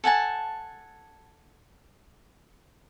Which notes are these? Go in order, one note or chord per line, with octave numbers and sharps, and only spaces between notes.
A4 F#5 G#5 A5